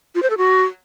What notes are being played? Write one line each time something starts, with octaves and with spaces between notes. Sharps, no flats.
F4
C5
A4
F#4